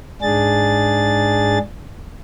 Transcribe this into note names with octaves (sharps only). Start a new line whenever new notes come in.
G#2 D4 G#4 A6